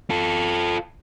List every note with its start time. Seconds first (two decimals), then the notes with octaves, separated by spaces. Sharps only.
0.10 F4 A4